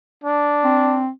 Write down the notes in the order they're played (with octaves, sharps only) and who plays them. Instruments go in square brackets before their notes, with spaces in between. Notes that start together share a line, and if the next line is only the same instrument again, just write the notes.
[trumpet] D4
[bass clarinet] C4